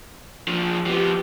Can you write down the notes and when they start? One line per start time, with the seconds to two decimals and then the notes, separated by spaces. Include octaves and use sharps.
0.48 F3 D4
0.86 F3 B3 G4